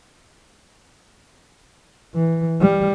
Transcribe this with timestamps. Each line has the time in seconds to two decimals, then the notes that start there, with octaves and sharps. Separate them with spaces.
2.15 E3
2.61 G3